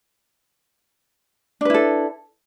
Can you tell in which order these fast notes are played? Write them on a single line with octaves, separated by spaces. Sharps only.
D4 B4 E4 A4